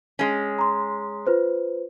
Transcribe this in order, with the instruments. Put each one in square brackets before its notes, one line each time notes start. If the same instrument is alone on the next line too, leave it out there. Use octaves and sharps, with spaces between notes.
[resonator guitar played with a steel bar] G#3 C#4
[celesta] A#5 C6
F4 B4 C5